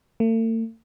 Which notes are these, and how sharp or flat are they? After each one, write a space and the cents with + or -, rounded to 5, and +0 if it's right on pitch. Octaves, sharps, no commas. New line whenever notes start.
A3 +45